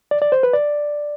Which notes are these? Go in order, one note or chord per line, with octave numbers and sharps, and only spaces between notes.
D5
D5
C5
B4
D5